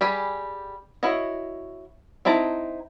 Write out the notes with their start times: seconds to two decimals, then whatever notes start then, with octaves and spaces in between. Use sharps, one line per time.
0.01 G3 G4 G#4 B5
1.03 E4 F#4 C#5 D#5
2.25 C4 D#4 E4 A5 A#5